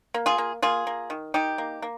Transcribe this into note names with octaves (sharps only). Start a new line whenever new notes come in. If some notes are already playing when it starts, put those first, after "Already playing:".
A#3
F4 G#4
A#3
A#3 F4 G#4
A#3
D#3
D#3 D#4 G4
A#3
A#3